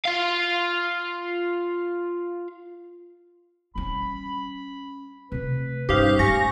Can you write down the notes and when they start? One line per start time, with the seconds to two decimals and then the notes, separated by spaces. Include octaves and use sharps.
0.06 F4 F5
3.75 G3 C#4 B5
5.32 C3 A3 B4
5.89 G2 C#4 D#4 G4 C5 F5
6.19 G#2 A3 G#5 C#6 A#6